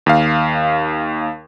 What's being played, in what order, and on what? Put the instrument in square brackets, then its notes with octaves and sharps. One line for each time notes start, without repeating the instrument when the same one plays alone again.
[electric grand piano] D#2 F5